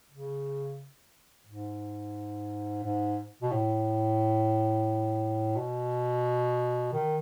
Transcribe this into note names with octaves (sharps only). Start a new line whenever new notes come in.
C#3
G#2
G#2
B2
A2
B2
D#3